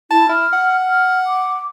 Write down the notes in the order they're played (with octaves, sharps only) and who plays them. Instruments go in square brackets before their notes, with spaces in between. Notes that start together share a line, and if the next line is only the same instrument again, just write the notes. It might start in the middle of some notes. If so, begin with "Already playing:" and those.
[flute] E4 [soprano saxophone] A5
[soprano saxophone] E4 [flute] F6
[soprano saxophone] F#5
[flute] F6
D6